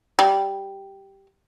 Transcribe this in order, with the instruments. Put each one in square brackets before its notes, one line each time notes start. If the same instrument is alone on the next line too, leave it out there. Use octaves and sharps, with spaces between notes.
[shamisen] G3